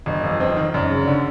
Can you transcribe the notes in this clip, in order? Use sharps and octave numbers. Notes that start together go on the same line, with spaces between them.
G1 D#5
F2
C4
D#3
F#2 D5
C#3
D3 D5